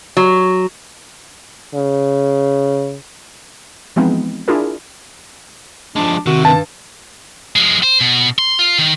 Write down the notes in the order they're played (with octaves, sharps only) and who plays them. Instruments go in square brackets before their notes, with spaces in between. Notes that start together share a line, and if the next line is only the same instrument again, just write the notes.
[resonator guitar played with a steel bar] F#3
[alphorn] C#3
[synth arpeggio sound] E3 F3 G#3 B3 C4 D#4
D4 E4 F4 G#4 A#4
[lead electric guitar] F3 G#3 [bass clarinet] D4
[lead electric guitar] C3 [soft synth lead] D#3 [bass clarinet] F#4
[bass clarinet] G2 [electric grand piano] A5
[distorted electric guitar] F3 G#3
C5
B2
C6
F4
D#3